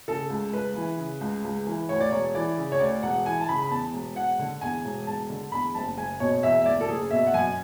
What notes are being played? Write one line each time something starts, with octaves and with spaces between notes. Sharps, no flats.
C#3 A4
C#2
C#2 B4
E3
C#3
C#2
C#2
E3
D2 C#5
D5
E1 C#5
E3 D5
C#3
C#5
D2 D5
E1 F#5
E3 G#5
A5
C#3 B5
B5
E2 A5
E1
E1 F#5
D3
E2 G#5
E1
E1 A5
D3
E2 B5
F#1 A5
F#1 G#5
B2 C#5
E2 E5
E5
F#1 D5
A4
F#1 G#4
B2 E5
F#5
F#2 G#5